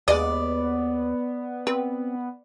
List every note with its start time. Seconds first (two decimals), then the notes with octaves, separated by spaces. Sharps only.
0.08 D#2 G#3 B3 D5 D#5
1.67 C4 B4